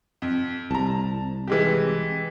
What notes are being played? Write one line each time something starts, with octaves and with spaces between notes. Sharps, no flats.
F2
C2 A5 A#5
E3 G#3 G4